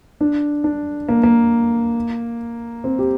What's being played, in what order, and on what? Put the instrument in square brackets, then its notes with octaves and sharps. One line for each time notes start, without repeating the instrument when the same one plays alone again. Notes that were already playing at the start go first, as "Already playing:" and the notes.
[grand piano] D4
D4
A#3
A#3
C4
G4